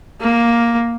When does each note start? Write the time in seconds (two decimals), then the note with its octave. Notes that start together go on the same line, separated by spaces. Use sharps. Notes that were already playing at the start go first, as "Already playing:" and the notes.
0.21 A#3